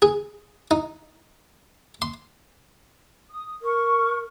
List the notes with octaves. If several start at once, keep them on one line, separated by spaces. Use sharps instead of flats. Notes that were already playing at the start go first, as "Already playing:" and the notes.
G#4
D#4
C6
D#6
A#4 C#6